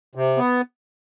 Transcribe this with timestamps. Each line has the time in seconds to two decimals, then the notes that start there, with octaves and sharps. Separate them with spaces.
0.15 C3
0.37 B3